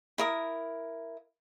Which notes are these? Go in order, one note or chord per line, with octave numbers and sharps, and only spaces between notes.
E4 A#4 D#6